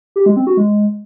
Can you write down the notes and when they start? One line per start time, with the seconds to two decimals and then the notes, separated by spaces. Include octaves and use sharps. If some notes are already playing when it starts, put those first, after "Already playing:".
0.16 G4
0.26 G#3
0.36 C4
0.47 F#4
0.57 G#3